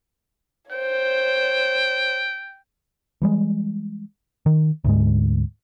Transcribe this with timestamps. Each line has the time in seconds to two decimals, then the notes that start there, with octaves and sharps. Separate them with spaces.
0.71 C5 C#5 G5
3.22 E3 G3 G#3
4.46 D#3
4.84 D2 G#2 G#3